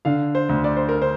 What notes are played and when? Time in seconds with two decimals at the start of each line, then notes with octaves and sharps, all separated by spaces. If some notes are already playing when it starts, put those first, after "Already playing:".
0.05 D3 F5
0.35 C5
0.49 D2
0.64 D5
0.77 C5
0.89 A#4
1.02 C5